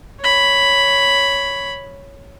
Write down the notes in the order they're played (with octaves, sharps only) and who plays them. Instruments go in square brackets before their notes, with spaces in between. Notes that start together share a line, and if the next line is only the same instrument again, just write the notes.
[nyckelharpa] C#5 B5